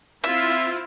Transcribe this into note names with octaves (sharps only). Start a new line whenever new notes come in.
C4 E4 F4 E5